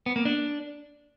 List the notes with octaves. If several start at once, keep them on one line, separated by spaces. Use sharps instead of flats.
B3
A#3
D4